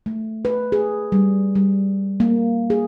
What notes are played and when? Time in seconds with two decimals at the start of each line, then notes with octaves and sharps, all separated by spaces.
0.06 A3
0.45 B4
0.72 G#4
1.12 G3
1.55 G3
2.20 A#3
2.70 G#4